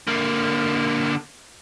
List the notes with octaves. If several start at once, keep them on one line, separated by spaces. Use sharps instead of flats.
D3 A#3